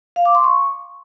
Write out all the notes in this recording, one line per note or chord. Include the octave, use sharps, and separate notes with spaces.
F5
D6
C6
C#6